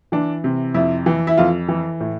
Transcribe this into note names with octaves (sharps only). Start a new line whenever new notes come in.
E3 D4
C3
F2 E4
E3
E4
F2 F4
E3
A2